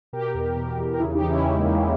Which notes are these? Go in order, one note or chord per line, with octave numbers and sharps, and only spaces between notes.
B2 G4 A#4
E2
B2
E2
A#4
C#3 E4 G#4
D#4 G4
E3
C#4 E4
E2 G#3
A#3
E2
G#3